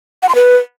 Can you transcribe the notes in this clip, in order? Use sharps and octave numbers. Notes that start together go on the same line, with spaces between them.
F#5
C6
B4